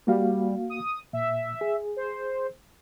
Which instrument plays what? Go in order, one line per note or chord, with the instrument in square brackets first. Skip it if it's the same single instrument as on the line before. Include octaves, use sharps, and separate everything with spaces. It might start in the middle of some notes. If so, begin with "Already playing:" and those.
[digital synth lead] G3 [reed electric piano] A#3 F#4 F5
[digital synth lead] D#6
[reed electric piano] A#2 [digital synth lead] E5
[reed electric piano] G#4
[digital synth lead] C5